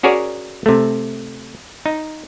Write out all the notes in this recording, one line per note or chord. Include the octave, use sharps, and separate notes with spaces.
C#4 F#4 G#4 A#4 C#5 D5
C3 A3
D#4